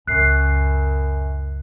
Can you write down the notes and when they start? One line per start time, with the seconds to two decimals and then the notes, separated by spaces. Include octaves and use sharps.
0.07 C#2 F#2 F#6 C7